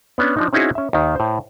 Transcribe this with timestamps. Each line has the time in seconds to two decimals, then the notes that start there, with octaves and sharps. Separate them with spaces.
0.18 B3 C#4 D4
0.37 F3 D4 D#4
0.53 C4 C#4 D#4 E4 F#4 G#4
0.75 C#4 E5
0.93 D#2 D#3
1.16 A2 C5